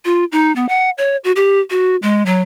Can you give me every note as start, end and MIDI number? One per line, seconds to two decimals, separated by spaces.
0.05 0.25 65
0.32 0.54 63
0.56 0.66 59
0.69 0.90 78
0.98 1.17 73
1.24 1.32 66
1.36 1.60 67
1.70 1.96 66
2.02 2.25 56
2.26 2.41 54